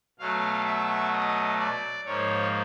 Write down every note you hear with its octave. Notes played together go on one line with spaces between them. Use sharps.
B2 F#3 A3 F5
E5
D#5
D5
G#2 F3 A#3 C#5